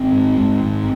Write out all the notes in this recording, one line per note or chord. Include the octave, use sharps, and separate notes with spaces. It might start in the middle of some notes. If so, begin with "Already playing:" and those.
Already playing: G#1 C4
G#2
G#2
G#1